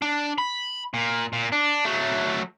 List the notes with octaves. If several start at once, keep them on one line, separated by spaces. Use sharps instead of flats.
D4
B5
A#2
A#2
D4
F#3 A3